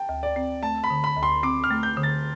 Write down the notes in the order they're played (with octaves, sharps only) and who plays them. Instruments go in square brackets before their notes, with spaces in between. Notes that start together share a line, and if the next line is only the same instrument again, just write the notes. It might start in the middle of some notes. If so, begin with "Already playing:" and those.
Already playing: [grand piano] G5 A5
[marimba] D2
[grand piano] D5
[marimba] C4
[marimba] A3 [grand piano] A5
[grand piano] B5
[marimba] D3
[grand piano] B5
[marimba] D2
[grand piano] C6
[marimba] C4 [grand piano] D6
[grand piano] F6
[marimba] A3
[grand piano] G6
[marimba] D3
[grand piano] A6